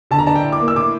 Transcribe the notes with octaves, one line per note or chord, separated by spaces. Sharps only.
D3 A5
A#5
D4 A5
G5
A2
D6
A#3
E6
A2 D6